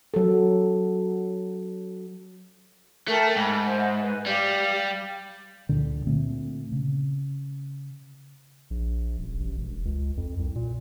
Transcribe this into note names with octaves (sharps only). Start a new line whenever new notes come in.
F#3 A4
A3 A#4 G5 A5
G#2 B5
C5 D#5 E5
B4 G#5
G3 G4 F5
C#2 A#2 D3
A#2 D3 A3 C4
C#3
A#1
D#1
A1
E1
C#2
F2
C2
A#2